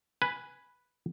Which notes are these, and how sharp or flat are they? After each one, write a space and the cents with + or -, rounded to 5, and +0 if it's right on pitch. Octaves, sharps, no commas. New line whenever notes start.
B4 +0 G#5 +0